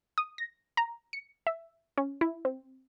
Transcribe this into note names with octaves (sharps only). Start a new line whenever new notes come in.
D#6
A#6
A#5
C#7
E5
C#4
E4
C4